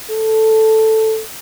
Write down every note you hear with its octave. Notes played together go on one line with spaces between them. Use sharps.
A4